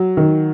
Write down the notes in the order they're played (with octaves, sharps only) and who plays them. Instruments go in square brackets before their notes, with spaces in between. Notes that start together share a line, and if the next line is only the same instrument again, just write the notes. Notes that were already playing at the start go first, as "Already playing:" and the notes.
Already playing: [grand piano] F#3
D#3